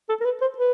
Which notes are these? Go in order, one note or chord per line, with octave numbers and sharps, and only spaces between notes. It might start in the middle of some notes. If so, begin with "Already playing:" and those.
A4
A#4
B4
C5
B4